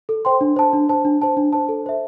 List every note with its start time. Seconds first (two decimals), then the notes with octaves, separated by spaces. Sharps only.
0.09 A4
0.25 C5 G5 C6
0.41 D4
0.56 C5 A5
0.73 D4
0.89 C5 A5
1.05 D4
1.22 C5 A5
1.37 D4
1.53 C5 A5
1.69 A4
1.86 C5 E5